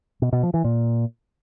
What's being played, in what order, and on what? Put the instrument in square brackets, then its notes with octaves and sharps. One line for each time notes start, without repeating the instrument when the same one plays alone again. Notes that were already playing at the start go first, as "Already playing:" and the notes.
[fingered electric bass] B2
B2
F3
E3
A#2